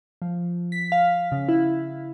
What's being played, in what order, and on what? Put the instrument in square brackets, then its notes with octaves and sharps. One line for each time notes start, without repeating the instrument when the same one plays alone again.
[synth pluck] F3
B6
F5
C#3
E4